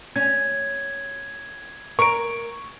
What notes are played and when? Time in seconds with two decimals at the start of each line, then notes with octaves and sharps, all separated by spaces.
0.16 C#4 G#6
1.99 A#4 C#6 D7